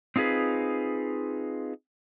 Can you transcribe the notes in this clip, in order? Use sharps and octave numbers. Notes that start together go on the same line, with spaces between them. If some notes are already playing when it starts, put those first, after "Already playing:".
C4 D#4 F4 G#4 B4